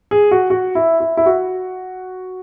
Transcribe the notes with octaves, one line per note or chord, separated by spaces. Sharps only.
G#4
F#4
F#4
E4
E4
E4
F#4